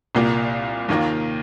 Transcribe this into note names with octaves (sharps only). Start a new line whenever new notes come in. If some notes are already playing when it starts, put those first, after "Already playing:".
C2 A#2 A#3 F4
D#2 D#3 A#3 F4